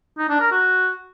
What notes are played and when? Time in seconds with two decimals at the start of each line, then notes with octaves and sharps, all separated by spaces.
0.18 D#4
0.29 D4
0.40 A#4
0.51 F#4